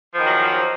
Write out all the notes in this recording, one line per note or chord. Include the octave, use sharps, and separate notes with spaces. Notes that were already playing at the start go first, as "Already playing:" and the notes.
E2 D#3 F3 F#3